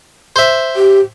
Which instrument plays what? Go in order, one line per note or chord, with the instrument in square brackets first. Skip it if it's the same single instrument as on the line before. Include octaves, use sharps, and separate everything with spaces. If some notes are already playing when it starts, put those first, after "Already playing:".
[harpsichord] C5 E5
[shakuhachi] G4